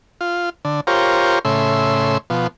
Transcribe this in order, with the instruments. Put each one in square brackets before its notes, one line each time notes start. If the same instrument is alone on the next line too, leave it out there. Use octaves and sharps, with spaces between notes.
[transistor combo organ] F4
D3
F4 G4 A#4 C5 C#5
A2 C#3 E5 C6
B2 F3